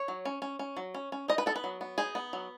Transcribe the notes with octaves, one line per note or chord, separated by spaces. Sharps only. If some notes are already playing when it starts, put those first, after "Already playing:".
Already playing: C#5
F#3
C#4
C#4
C#4
F#3
C#4
C#4
D#4 D#5
B4
B3 A4
B4
F#3
B3
D#4 G#4
B3
F#3